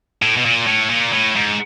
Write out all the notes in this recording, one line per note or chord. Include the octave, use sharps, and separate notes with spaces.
A2
B2
A#2
A2
A#2
A2
G#2